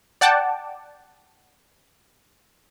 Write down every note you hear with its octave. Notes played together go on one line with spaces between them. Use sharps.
D5 F#5 G5 A5 D6